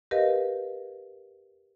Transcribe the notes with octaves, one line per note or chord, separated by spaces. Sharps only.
G4 A#4 B4 D#5 F5